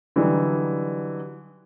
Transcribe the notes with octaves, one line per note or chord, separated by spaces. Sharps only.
D3 E3 F#3 G3 D#4